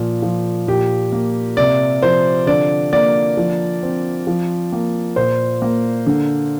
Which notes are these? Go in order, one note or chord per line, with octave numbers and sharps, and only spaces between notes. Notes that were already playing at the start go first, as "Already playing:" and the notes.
Already playing: A#2 F3
F3
A#2 G4
A#3
C3 D5
F3 C5
D3 D5
A#3 D5
F3
C4
F3
A#3
A#2 C5
A#3
D3